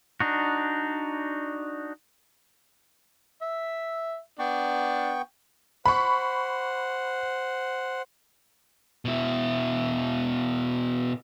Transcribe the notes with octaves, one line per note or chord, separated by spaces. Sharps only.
D4 D#4 F#4
E5
B3 D4 G5 C#6
C5 F#5 B5 C#6
B2 E4